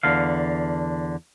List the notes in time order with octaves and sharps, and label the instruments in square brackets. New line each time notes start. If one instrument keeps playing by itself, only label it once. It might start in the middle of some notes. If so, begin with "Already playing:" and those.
[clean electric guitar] E2 D3 F5